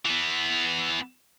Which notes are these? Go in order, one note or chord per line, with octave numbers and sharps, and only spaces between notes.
E3 B3